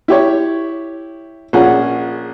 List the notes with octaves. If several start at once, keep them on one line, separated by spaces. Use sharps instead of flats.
E4 G4 C#5
A#1 F3 C#4 G#4 F#5